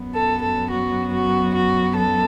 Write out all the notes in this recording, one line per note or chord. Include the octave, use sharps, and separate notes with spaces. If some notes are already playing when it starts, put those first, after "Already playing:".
Already playing: F#2 F#3 B3
A4
A4
F#4
F#4
F#4
A4